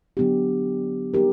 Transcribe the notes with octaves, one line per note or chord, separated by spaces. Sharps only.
D3 F#3 B3 D4 G4
G3 B3 D#4 G4 A#4